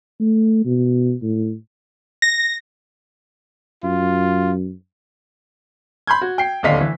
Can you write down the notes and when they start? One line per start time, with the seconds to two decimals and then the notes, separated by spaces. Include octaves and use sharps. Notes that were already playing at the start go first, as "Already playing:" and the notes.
0.20 A3
0.65 B2
1.23 A2
2.22 A#6
3.84 F#2 F4
6.07 B5 C6 G6 G#6
6.21 F#4
6.38 G5 C7
6.63 D1 D#2 D3 D#5 F5 B6
6.81 E3